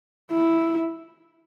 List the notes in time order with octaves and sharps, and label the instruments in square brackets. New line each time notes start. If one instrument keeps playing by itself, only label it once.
[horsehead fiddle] E4